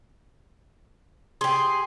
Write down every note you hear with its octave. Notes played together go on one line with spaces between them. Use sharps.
G4 G#4 C6